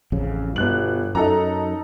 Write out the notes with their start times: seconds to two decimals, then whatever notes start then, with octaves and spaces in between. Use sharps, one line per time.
0.12 A1 F2 C#3
0.56 G1 G2 B2 F#6 F#7
1.15 F#2 D#4 A4 A#5